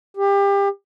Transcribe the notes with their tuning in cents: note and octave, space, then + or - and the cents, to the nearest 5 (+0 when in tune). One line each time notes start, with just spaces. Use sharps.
G4 +30